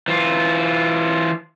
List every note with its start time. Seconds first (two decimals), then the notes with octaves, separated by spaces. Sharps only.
0.08 E3 F4